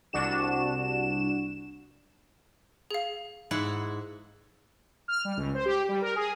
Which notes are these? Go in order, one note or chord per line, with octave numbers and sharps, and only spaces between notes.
C2 D4 F#4 E7
G#4 F5
G#2 E4 F#5
F6
G3
C#2
C5
G4
G3
A#4
G#4